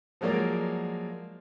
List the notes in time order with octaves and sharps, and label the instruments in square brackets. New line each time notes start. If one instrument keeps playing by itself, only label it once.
[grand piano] F3 F#3 G#3 A#3 A#4 D5